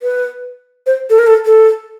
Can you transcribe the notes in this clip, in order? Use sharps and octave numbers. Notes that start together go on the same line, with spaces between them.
B4
C5
A4
A#4
A4
A4